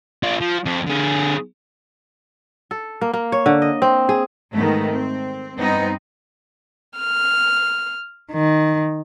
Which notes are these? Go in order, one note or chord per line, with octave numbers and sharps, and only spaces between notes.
D4 F4
F3
F2
D3 G#4
A4
A#3
A#3
C#5
D3
D#5
C4
G#4
G#2 D#3 A3 B3
C4
G2 B3 C4 D#4
F6
D#3